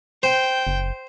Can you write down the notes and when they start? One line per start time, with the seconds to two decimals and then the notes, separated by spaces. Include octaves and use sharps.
0.23 C5 G5
0.67 F#1